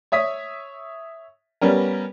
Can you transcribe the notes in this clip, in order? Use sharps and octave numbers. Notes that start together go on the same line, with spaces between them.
C#5 E5 D#6 B6
G3 B3 C#4 A#4